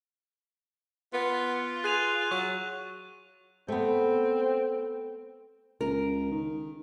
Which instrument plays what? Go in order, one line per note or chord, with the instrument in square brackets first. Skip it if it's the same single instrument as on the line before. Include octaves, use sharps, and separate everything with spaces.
[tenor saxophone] B3 [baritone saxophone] F4
[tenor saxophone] G#4 [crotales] F#6 D#7 F7
[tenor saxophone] F#3 [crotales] C#6
[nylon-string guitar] A3 B3 [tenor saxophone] C4
[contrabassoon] C#2 [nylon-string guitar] A#4
[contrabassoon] D#3